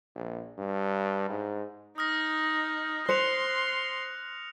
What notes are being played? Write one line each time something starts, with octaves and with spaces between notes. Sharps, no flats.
A#1
G2
G#2
D#4 D#6 F6 A#6
C5 C6 F#6 C#7 F7